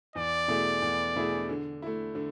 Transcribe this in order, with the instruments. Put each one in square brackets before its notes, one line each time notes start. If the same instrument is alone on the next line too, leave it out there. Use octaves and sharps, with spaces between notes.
[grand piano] E2 [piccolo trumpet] D5
[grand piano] B2 A3 E4 G#4
E2
B2 A3 E4 G#4
D3
A3 E4
D3